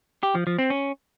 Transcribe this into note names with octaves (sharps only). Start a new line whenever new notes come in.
G4
F3
F3
C4
C#4